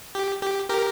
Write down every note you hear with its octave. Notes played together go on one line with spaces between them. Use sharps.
G4
G4
G4 A#4